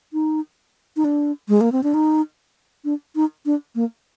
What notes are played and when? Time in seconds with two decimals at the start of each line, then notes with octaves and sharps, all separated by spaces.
0.13 D#4
0.96 D#4
1.05 D4
1.49 G#3
1.61 A#3
1.72 C4
1.83 D4
1.94 D#4
2.85 D4
3.16 D#4
3.46 D4
3.75 A#3